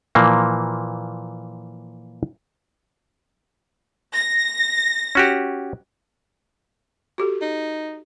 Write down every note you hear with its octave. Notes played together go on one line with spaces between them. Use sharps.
A#2 E3 F3 A#3
A#6
C#4 F#4 G4
F#4 G4 A4
D#4